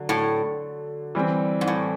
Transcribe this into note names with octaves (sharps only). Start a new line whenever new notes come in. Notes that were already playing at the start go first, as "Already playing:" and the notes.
Already playing: D3 F#3
A2
E3 G3 C4
G#2
A2